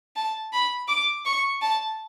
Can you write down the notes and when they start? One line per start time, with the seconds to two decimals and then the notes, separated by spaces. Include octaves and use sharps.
0.16 A5
0.53 B5
0.89 D6
1.25 C#6
1.62 A5